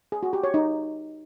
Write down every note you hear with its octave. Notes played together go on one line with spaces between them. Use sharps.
G#4
F#4
G4
C#5
D#4